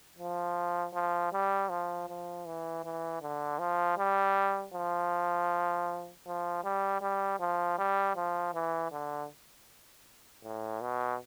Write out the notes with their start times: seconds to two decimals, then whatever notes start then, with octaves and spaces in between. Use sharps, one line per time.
0.19 F3
0.94 F3
1.33 G3
1.70 F3
2.09 F3
2.46 E3
2.84 E3
3.22 D3
3.59 F3
3.98 G3
4.74 F3
6.26 F3
6.64 G3
7.02 G3
7.40 F3
7.78 G3
8.16 F3
8.54 E3
8.92 D3
10.44 A2
10.81 B2